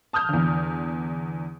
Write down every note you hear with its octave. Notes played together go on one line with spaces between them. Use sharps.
A5 D#6 F6 G6
E2 D3